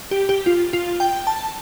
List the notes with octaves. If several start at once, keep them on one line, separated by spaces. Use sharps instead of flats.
G4
G4
F4
F4
G5
A5